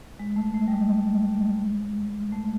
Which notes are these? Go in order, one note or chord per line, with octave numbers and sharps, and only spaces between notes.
G#3
A3
A3
G3
G#3
A3